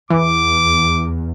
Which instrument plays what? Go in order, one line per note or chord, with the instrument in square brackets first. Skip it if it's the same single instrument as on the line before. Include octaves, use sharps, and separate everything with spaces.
[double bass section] E2 [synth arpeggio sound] E3 [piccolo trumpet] D6